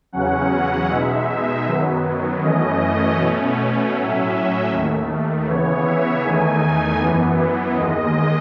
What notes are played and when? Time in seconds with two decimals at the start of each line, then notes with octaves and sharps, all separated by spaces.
0.12 E2 C#3 F#3 C#4 F#5
0.88 B2 G#3 D#4 E5
1.65 F#2 D#3 F#3 B3
2.41 F#2 E3 A3 C#4 D#5
3.17 B2 A3 C#4
3.93 A2 F#3 C#4 E5
4.70 D#2 D#3 A3
5.46 C#3 E3 B3 C#5
5.84 E5
6.22 E2 D#3 A3 D#4 G#5
6.99 F#2 E3 B3
7.75 D#2 D#3 G#3 D#5